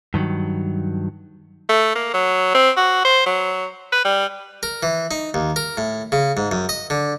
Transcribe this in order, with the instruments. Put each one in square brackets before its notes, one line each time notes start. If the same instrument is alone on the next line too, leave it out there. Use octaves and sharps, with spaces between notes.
[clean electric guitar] G2 D#3 E3 F#3
[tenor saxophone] A3
A#3
F#3
C4
F#4
C5
F#3
B4
G3
[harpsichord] A#4
E3
D#4
D#2
A#4
A2
C#3
G#2
F#2
D#5
D3